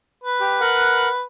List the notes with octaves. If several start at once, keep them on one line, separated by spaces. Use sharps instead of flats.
B4
G4
A#4 F#5 F#6